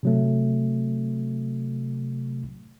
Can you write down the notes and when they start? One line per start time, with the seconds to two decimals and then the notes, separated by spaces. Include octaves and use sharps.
0.03 C3 F#3 A3